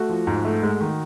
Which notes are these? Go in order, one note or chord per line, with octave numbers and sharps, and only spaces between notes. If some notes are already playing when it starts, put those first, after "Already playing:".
Already playing: A3 F#4
F3
G#2
A3
G#3
D#3